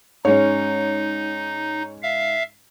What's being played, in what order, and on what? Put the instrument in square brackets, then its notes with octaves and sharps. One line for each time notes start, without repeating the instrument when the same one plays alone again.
[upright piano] G#2 G#3 C#4 [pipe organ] D#4 [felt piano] C#5
[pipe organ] E5 F5